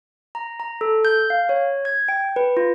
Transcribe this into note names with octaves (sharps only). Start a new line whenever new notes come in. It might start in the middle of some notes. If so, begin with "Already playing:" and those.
A#5
A#5
A4
G6
F5
C#5
G#6
G5
B4
F4